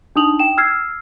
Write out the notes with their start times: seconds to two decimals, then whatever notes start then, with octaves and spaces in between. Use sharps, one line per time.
0.16 D4 D#4 D#6 F7 F#7
0.39 G5 E7
0.57 E6 F6 G#6 C7